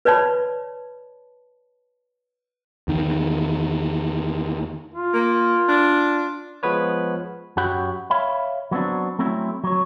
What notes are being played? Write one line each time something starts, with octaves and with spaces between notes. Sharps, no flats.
B4 C#5 D5 A5 B5
E2 D#3
F4
A#3
D4
F3 G#3 B3 B4 C#5
F#2 F#3 F#4 G4 F#5 B5
C#5 E5 F5 B5
F#3 B3 C4 D4
F#3 A3 C4 C#4 E4
F#3 C#5